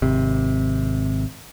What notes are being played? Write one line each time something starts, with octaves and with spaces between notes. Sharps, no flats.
G#1 C3